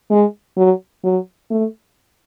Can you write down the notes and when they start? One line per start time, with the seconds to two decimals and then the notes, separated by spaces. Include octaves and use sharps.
0.10 G#3
0.57 F#3
1.04 F#3
1.50 A3